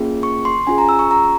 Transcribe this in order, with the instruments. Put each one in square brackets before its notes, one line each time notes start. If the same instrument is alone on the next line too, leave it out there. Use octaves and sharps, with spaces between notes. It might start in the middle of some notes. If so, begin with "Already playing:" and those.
Already playing: [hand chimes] A#3 C#4 F4 G#4
C#6
C6
C#4 F4 G#4 G#5
A#5
E6
C#6
A#5